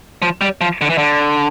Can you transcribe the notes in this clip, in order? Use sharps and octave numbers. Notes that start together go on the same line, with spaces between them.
F3
G3
F3
D3
E3
D3